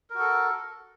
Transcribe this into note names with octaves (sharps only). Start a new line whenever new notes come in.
F#4 A4 A#4